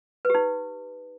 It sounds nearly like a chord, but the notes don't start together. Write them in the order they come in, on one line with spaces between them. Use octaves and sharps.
B4 G4 D#4